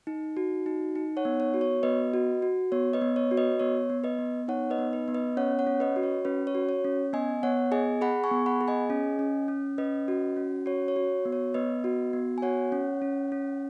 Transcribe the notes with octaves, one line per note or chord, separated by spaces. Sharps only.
D#4
F#4
D#4
D#4
C#5 F#5
B3
C#5
F#4
C#5
B3 B4 D#5
F#4
F#4
B3 C#5
B4 D#5
B3
C#5
F#4
B4 D#5
B3 C#5
B3
B4 D#5
B3
D#4 C#5 F#5
B4 D#5
B3
B4
B3
B4 D#5
C#4 C#5 F#5
C#5 F#5
C#4
B4 D#5
F#4
C#5
C#4 B4
C#5
F#4
C#5
C#4
B3 D#5 G#5
B3 C#5 F#5
G#4 D#5 G#5
G#4 F#5 B5
G#5 C#6
B3
F#5 B5
G#4
D#5 G#5
C#4
C#4
C#4
C#4 B4 D#5
F#4
C#4
F#4 C#5
C#5
F#4
B3
C#5
B3 B4 D#5
F#4
B3
G#5
F#4 C#5 F#5
C#4
C#4
C#4